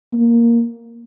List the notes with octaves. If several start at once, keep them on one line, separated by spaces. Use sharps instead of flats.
A#3